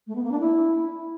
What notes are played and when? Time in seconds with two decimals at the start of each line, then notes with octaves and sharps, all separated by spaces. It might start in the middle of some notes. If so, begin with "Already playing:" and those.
0.07 A3
0.15 B3
0.23 A#3
0.32 D4
0.40 E4